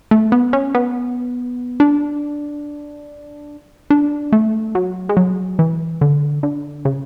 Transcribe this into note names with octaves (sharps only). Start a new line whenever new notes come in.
A3
B3
C#4
B3
D4
D4
A3
F#3
G#3
F#3
E3
D3
D3
C#3